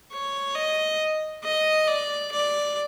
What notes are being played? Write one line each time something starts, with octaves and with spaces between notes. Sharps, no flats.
C#5
D#5
D#5
D5
D5